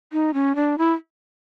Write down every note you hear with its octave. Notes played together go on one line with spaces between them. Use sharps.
D#4
C#4
D4
E4